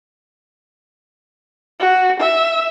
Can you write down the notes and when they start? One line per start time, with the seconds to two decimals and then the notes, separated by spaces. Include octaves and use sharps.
1.80 F#4
2.20 E5